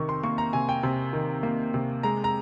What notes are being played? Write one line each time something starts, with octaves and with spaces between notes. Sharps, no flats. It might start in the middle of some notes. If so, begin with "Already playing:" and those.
Already playing: C3 D#3 C#6
C6
A#3 C#6
A#5
C3 G#5
G5
C3
D#3
A#3
C3
G#3 A#5
A#5